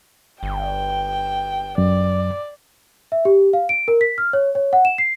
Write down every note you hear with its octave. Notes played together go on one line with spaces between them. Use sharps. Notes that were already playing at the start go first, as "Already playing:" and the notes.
G1 G5
F#2 D5
E5
G4
F5
D7
A#4
B6
F6
C#5
C#5
F#5
E7
C7